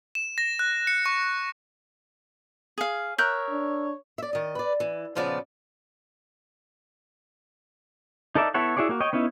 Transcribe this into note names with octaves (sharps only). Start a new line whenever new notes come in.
E7
A#6
F#6
C#7
C#6
G#4 F5
A#4 C#5 E5 F#6 G6
D4
D5 E5
D#3 D#5
B4 D5
E3
A#2 C#3 F3 B3 D5
D#4 A4 A#4 D5 E5
B3 E4 A4 C#5 F#5
E4 F#4 G#4 C#5 D5
A#3 F#4
C#5 D#5 G5
B3 C#4 D#4 E4